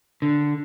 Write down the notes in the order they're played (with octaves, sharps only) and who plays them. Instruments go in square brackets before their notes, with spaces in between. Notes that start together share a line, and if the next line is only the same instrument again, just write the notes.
[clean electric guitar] D3